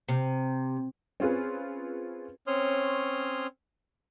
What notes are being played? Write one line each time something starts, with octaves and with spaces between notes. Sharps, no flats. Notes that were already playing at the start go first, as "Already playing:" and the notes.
C3
C4 C#4 F4 G#4 B4
C4 C#4 C#5 C6 D#6 F6